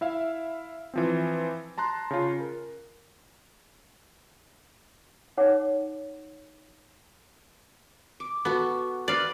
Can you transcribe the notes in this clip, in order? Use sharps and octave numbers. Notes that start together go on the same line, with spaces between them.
E4 E5 F5
E3 F3 C4
A5 A#5 C6 F#6
C#3 F4
A#4
D#4 C#5 F#5 D6
D6
B3 F#4 A4 D6
B4 D5 F5